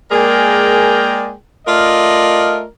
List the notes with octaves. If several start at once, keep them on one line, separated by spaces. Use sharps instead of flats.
G#3 A#3 G#4 A#4 D5 G5
A3 F4 A#4 D5 D#5